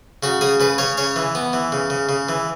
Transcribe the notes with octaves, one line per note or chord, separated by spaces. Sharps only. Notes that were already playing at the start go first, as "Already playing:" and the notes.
C#3 F#4
C#3 G#4
C#3 B4
C#3 C#5
C#3 C#5
E3
B3
E3
C#3
C#3
C#3
E3